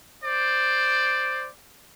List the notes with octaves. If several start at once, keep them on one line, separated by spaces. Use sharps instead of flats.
C5 D5